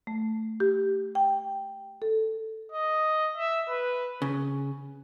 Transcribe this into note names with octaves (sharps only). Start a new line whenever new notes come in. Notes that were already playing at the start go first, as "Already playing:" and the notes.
A3
G4
G5
A4
D#5
E5
B4
C#3